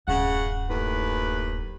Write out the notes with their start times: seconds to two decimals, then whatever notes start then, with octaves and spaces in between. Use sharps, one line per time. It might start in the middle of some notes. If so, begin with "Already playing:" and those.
0.08 D1 F#2 C#3 F#5
0.70 D#2 A2 B4